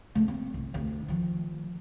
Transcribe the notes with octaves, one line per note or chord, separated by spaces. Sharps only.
C#3 A3
A#3 C4
C2
D2
D#3 F3